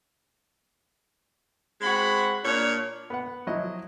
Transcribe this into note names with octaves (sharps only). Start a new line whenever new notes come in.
G#3 C4 F#4 F#5 B5
A#2 D4 C#5
B3 F#5
F3 F#3 E4 D#5